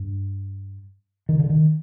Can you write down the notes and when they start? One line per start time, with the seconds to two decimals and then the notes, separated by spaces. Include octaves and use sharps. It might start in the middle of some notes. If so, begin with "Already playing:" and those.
Already playing: G2
1.29 D#3
1.39 D3
1.50 D#3